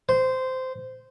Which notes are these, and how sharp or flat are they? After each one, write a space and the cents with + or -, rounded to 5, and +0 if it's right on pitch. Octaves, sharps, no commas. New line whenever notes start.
C5 -15